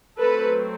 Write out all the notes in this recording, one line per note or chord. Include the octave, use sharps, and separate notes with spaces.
F#3 A3 C4 A4 B4